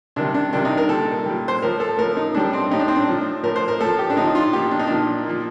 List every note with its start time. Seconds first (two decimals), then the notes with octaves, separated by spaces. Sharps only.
0.16 C3 D#3 G3 D4
0.34 D4
0.53 C3 D#3 G3 D4
0.65 D#4
0.77 A#4
0.89 A#2 G3 A4
1.26 A#2 G3
1.48 C5
1.62 A2 F3 A#4
1.80 A4
1.98 A2 F3 A#4
2.17 D#4
2.34 A2 G3 D4
2.45 D4
2.53 C4
2.71 A2 G3 D#4
2.80 D4
2.88 C4
2.96 D4
3.08 A2 F3
3.43 A2 F3 A#4
3.56 C5
3.68 A#4
3.80 A2 F3 A4
3.99 G4
4.10 D4
4.17 A2 D#4
4.21 F3
4.27 D#4
4.35 F4
4.53 A#2 F3 G4
4.71 D4
4.79 D#4
4.87 A#2 F3 D4
5.26 A#2 F3